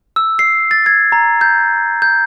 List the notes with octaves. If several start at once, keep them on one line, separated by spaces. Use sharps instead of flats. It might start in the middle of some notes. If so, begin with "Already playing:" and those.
E6
C7
A6
G#6
A#5
G6
G6